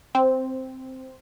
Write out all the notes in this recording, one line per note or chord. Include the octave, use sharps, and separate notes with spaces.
C4